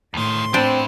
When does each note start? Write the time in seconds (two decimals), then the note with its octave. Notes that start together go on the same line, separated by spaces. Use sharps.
0.14 D2 A2 D#3 C6
0.54 B3 C4 D4 E4 C5 D5